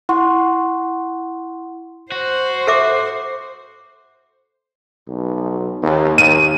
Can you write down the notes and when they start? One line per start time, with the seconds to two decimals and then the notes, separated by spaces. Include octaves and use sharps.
0.09 E4 F#5 C6 C#6
2.12 F#4 C5
2.67 A4 E5 D6
5.08 B1
5.83 D#2
6.18 D#2 D#7